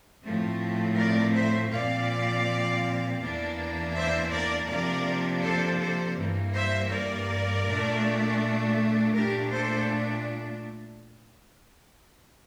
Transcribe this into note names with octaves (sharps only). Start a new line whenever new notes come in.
A2 F3 A3 C4
A#4 D5
C5 E5
A#2 F3 C4 D5 F5
E2 E3 A#3 D4
C5 E5
A#4 D5
C3 F3 A#3 D4 A#4 D5
A4 C5
A4 C5
G2 E3 A#3
C5 E5
A#4 D5
A#2 A3 D4
A#2 A3 D4 G4 A#4
A4 C5